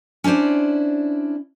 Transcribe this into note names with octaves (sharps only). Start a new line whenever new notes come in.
C#4 D4 E4 C5 D5